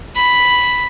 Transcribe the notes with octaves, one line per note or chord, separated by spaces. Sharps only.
B5